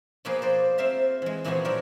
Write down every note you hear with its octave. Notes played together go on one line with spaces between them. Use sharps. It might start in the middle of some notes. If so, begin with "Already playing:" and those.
B2 F3 A#3 G#4 B4
C5 D5
C4 F4 C5 E5 F5 A#5
E3 G#3
A#2 E3 F3 B3 F#4 G#4
G3 C4 D4 G4 A#4 C#5